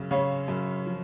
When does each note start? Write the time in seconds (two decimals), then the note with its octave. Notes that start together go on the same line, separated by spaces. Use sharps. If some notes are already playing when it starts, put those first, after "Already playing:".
Already playing: F#2 C#3
0.11 C#3 C#5 F5
0.48 F#2
0.86 F3